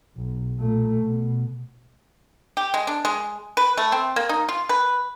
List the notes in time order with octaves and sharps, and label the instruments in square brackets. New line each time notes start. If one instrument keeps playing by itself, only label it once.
[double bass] B1
A#2 A3
B2
[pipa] G4
G#3
D4
G#3
B4
A3
C4
A#3
D#4
F4
B4